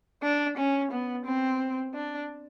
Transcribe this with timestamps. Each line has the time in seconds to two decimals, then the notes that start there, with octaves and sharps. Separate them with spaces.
0.23 D4
0.58 C#4
0.91 B3
1.26 C4
1.94 D4